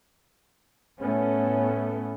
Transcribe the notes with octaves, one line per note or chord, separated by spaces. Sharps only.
A2 A3 B3 C#4